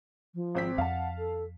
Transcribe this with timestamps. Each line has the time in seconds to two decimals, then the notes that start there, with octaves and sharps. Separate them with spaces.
0.35 F3
0.55 G#1 C4 B6
0.78 F2 F5 F#5 A5
1.18 A4